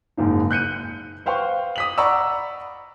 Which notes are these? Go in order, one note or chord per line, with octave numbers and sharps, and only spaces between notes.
F#1 G#2 A#3 D#4
F#6 G6 C#7 D#7
B4 C5 F5 G5 C6 C#6
D#6 B6 F#7
D5 F#5 A#5 B5 C#6 E6